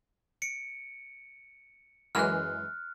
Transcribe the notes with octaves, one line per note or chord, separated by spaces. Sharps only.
C#7 D7
F#2 E3 G#3 F6 F#6